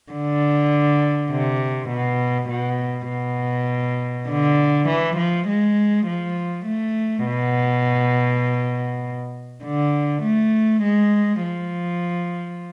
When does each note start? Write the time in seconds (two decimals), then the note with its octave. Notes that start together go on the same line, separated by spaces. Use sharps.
0.12 D3
1.31 C3
1.90 B2
2.50 B2
3.09 B2
4.29 D3
4.88 E3
5.17 F3
5.48 G#3
6.07 F3
6.66 A3
7.26 B2
9.64 D3
10.23 A3
10.83 G#3
11.43 F3